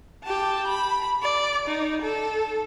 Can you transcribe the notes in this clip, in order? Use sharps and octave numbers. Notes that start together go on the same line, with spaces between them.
G4 A5
B5
D5
D#4
A4